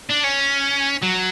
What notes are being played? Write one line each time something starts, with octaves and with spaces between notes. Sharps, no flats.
D4
C#4
F#3